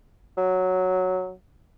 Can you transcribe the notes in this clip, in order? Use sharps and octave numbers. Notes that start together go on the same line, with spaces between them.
F#3